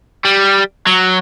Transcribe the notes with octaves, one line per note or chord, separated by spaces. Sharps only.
G3
F#3